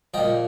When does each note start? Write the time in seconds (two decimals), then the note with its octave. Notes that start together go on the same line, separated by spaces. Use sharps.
0.14 A#2 F3 D#5 G5